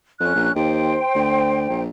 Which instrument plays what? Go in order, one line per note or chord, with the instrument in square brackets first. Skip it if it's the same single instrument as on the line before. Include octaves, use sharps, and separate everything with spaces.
[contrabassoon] F2 [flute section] C#4 F#6
[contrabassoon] A#1
[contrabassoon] D#2 [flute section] C5 G5
[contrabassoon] D2
A#1